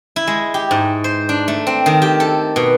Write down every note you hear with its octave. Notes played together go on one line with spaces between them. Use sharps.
E4
G#3
G4
G#2
C5
D4
A3
C4
D#3
G4
A4
B2